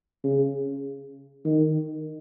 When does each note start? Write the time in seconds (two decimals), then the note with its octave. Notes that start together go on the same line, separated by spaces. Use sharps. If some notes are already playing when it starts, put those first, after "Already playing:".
0.24 C#3
1.45 D#3